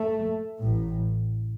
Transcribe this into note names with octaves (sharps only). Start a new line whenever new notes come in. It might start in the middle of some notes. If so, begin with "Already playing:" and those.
Already playing: A3
A1 A2